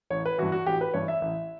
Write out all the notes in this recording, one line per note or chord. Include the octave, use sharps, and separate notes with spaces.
A1 C#5
B4
G2 E3 F#4
F#4
A1 G4
B4
G2 E3 C#5
E5
A1